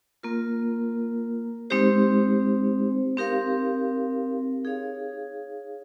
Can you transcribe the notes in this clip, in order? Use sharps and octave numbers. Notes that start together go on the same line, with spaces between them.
A#3 F4 A#4
G#3 C4 D#4 G4 C5
C4 D#4 G4 A#4 F5
D#4 G#4 C#5 F5